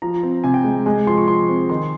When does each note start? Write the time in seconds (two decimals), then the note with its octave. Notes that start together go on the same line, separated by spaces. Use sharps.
0.02 F3 A#5
0.23 C4
0.44 C3 G#5
0.54 G5
0.64 G#3
0.86 G#3 G#5
1.07 F3 C6
1.18 C#6
1.28 F3 C6
1.49 C4
1.69 D#3 C6